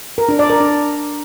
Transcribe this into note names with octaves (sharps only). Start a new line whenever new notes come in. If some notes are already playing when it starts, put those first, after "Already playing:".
A#4
D4
D5
A#4
D4